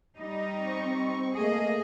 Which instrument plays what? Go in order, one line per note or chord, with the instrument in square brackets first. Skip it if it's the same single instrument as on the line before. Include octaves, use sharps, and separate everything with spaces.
[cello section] G3 D#4
[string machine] C4 C#6
[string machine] A3 A#3 [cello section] G#4 D#5